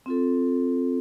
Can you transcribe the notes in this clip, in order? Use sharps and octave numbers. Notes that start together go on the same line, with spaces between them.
C4 F4 A4